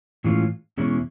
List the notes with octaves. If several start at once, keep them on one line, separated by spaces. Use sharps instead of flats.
A2 E3 G#3 C#4 F4
E2 B2 G#3 C#4 E4